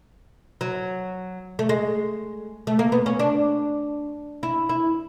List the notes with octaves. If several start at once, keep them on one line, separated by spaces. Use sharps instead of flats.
F#3
A3
G#3
A3
A#3
B3
C#4
D4
E4
E4